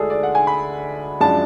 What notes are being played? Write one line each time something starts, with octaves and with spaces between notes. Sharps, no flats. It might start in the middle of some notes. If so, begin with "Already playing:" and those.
Already playing: D2 D3 G#3 D4 G#4 A4
D5
F#5
G#5
B5
F#2 F3 G#3 D4 A5